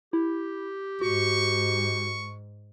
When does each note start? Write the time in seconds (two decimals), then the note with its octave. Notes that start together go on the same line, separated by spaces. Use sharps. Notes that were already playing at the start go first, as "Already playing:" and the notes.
0.13 E4 G4
1.01 G#2 F#4 C#6